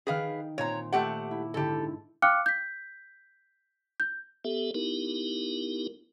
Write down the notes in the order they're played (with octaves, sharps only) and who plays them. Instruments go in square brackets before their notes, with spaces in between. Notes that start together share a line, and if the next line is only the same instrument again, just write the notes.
[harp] D#3 G5 [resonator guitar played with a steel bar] G#4 B4 F5
[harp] A#2 C4 [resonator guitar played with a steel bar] C#5 A#5
[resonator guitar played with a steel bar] A3 G4 F#5 [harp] D5 E5
[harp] E4
[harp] G#2 D3 E4 [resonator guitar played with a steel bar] G4 A4
[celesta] F5 G5 D6 F6 F#6 C#7
G6 B6
G6
[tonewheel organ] B3 G4 A4 E5
B3 D#4 E4 G4 A#4